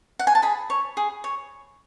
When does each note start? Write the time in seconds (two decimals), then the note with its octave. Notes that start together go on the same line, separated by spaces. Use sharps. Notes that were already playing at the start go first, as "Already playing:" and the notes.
0.19 F#5
0.27 G#5
0.35 A5
0.42 G#4 B5
0.70 C#5
0.97 G#4
1.24 C#5